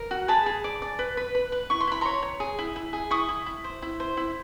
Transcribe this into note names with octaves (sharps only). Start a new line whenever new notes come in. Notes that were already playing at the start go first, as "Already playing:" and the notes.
Already playing: A#4
F#4
G#4 A5 B5
G#4
D5
D5
B4
B4
B4
B4
E4 C#6
C6
E4 B5
C#5 A#5 C6
C#5
G#4
E4
E4
G#4
E4 C#6 D#6
E4
E4
C5
E4
C5
E4